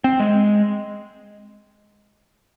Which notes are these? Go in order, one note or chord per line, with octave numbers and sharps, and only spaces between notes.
C4
G#3